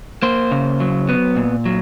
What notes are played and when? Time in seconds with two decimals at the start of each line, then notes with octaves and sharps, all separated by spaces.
0.22 A#3 C5
0.51 C#3
0.80 F#3
1.09 B3
1.36 A#2
1.66 F#3